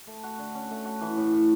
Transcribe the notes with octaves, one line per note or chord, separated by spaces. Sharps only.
A3
F#4
D3
C#4
A3
F#4
E3
A2
A2